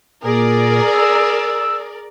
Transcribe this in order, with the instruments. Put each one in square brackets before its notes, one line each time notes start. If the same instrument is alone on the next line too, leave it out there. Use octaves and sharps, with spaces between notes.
[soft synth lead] A#2 [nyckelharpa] G#4 [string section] A#4 D5
[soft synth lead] E6